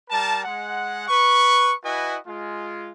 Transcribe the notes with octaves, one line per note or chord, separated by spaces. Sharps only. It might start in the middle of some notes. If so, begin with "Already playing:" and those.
G3 A#4 A5
G#3 F#5
B4 C#6
E4 F#4 B4 D#5 G#5
G#3 F4